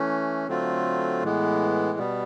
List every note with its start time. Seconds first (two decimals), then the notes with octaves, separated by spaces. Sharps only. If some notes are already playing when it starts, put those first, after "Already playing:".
Already playing: E3 A3 C#4
0.48 D3 F#3 A3 C4 F4
1.22 A2 E3 G#3 B3
1.98 B2 G3 B3